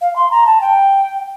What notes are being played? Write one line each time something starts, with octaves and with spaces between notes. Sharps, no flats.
F5
C6
A#5
A5
G5